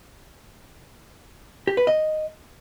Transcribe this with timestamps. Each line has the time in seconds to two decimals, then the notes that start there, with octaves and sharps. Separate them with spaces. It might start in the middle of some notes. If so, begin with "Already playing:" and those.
1.67 G4
1.77 B4
1.87 D#5